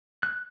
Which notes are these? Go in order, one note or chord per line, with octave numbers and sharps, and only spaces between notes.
F#6